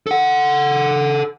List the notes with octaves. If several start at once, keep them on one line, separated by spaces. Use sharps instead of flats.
A4 F#5